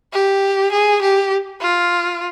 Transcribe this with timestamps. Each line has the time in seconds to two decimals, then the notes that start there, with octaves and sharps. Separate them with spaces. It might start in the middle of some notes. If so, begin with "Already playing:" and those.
0.13 G4
0.72 G#4
1.02 G4
1.61 F4